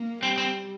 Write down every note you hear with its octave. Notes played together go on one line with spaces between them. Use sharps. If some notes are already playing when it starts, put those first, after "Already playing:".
Already playing: A#3
G3 C4
C4